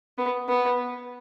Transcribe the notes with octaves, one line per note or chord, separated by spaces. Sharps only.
B3
B3